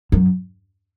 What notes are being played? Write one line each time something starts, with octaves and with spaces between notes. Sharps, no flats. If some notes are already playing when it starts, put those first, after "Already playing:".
F#2